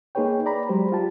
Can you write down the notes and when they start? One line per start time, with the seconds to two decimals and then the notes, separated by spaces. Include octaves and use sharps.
0.15 A#3 D#4 G#4 B4 C#5 G5
0.46 D5 A#5 B5
0.69 F#3 G#3 G4 C5
0.92 F4 G4 A5